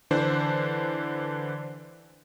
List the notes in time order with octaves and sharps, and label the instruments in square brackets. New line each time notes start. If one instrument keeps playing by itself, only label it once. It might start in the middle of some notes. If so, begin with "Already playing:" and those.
[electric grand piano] D3 E3 D4 C5